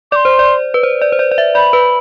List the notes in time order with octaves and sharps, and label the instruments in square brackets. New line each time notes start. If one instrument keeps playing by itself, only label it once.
[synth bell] D5 [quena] C6 D6
[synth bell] C5
D5
B4
C5
D5
C5
D5
D5
E5
[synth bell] D5 [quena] B5
[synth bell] B4